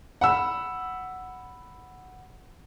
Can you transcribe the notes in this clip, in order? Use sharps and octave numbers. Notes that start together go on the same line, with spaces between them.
F#5 B5 E6